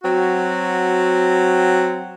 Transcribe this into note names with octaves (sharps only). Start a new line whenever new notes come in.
F#3 C4 F#4